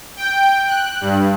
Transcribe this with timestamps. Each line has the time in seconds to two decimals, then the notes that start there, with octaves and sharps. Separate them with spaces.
0.17 G5
0.67 F#6
1.01 G2